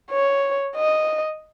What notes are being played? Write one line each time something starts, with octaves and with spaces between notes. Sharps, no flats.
C#5
D#5